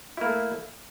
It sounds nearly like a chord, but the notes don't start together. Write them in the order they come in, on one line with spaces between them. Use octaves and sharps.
E4 A#3 A3